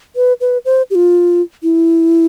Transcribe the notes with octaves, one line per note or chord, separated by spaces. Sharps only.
B4
B4
C5
G4
F4
E4